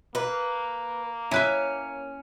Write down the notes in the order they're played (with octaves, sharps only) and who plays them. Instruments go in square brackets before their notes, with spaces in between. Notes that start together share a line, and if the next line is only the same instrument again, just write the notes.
[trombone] A#3 [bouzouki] B4
[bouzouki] C#4 [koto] E4 B4 E5